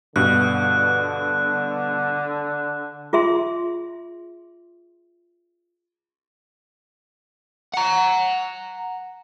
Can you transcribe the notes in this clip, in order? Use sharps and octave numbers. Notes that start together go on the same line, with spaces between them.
G2 B2 D3 F#6
F4 G#4 E5 C6
F#5 A#5